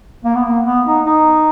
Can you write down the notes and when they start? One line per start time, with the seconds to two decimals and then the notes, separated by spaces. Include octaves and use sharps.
0.24 A#3
0.35 B3
0.46 A#3
0.66 B3
0.86 D#4
1.06 D#4